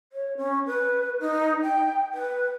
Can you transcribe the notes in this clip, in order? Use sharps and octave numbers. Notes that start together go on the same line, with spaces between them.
C#5
C#4
B4
D#4
G5
B4